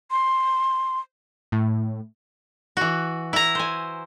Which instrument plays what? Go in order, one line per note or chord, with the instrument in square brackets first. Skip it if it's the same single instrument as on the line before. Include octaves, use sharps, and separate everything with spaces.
[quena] C6
[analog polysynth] A2
[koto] E3 F#4
E4 A#5
C5 G#5